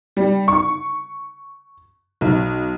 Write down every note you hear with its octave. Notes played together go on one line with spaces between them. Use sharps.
G3
C#6
B1